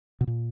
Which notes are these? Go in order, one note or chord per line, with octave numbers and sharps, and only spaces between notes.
B2
A#2